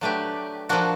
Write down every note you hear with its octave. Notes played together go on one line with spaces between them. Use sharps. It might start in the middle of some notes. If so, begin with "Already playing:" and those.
F#3 A3 D4 G4 B4
F3 A#3 D4 F#4